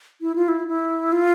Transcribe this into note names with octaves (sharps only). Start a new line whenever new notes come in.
E4
F4
E4
E4
F4